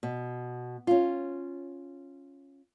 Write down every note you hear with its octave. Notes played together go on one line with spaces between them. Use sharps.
B2
C#4 F4